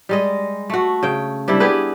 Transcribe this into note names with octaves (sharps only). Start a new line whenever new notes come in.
G3 G#3 D#5
A3 F#4
C#3 G5
C3 G3 D4 E4
B3 G4 G#4 B4